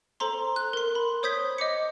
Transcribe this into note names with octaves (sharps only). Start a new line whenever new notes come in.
A4 C5 A#5 C6
F#6
A#4 C6
B5
C5 C#5 D#6 G6 G#6 B6
D#5 D6 C#7